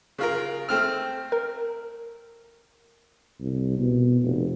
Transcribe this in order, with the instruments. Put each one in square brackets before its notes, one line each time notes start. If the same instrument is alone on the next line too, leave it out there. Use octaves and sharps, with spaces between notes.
[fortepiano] C#3 F4 A#4
A3 C4 F6
[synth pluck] A#4
[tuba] C2
B2
F1